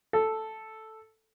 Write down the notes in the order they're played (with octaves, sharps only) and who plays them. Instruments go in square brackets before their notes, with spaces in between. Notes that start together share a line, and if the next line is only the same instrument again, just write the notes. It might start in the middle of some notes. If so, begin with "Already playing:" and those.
[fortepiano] A4